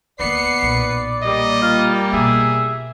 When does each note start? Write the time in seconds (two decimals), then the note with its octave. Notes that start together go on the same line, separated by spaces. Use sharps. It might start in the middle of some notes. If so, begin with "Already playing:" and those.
0.20 D2 A#3 B3 B4 D5 C7 C#7
0.62 B1 A#2
1.22 G3 A#3 D#5
1.62 F4
2.13 B2 F4 G#4 E5